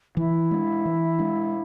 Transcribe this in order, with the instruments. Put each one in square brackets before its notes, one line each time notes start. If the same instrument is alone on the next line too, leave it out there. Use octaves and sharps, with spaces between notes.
[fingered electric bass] E3 [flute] E4
[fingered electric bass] G#3 D4
E3
G#3 D4